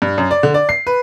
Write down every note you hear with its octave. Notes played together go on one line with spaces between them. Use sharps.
G2
F#2
D5
D3
D5
C7
B4